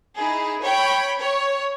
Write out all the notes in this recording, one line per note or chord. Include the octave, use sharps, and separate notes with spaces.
D#4 E4 G#4
C#5 G5 B5
C#5